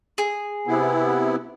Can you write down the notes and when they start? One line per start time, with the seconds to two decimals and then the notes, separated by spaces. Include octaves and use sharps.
0.18 G#4
0.67 C3 B3 E4